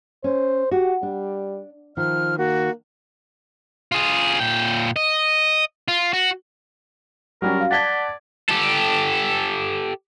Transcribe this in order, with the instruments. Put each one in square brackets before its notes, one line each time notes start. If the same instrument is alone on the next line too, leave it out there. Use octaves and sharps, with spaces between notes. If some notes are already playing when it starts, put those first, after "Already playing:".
[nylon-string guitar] C#4 [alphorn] C5
[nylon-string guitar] F#4 [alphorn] G4
[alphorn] G3 [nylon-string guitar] D4
[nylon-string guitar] D#3 [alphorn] F3 [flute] F6
[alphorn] A#3 [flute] F#4
[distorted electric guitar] F4 G#4
A#2 G5
D#5
F4
F#4
[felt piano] F#3 G3 C#4 [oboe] A#4
[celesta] F#4 F5
[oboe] D5 [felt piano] F#5 A5 G#6 [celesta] A6 B6 G7
[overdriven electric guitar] G4 A4